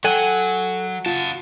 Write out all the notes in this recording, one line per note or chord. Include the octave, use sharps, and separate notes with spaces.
F#3 A4 F#5 G#5
F4 F#4 A5